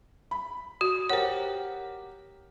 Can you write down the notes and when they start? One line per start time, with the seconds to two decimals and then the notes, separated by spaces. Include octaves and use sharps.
0.31 B5
0.81 F#4
1.09 G4 A#4 C5 C#5 F#5